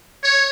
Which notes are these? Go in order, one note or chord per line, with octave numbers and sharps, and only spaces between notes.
C#5